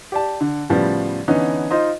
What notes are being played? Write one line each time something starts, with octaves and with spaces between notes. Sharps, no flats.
G4 D5 A5
D3
A2 C#3 F3 G3 B3
D3 E3 B3 C#4 D#4
D#4 F4 C5 D#5